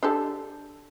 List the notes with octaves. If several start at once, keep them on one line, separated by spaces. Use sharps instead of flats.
D4 G4 A4